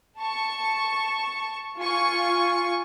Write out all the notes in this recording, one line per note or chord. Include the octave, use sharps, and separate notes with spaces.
A5 C#6
F4 G#5 C#6